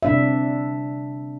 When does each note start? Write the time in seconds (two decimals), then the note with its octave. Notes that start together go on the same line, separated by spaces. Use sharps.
0.03 C3 D4 E5